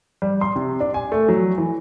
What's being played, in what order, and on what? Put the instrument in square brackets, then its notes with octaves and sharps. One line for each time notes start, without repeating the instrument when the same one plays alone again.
[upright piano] G3
C6
C3
D4
G#5
A3
F#3
E3